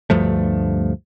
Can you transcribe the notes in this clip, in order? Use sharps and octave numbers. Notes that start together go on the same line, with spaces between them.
D2 G2 F3 A3